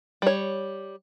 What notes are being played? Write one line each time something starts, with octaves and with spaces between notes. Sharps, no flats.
G3 C#5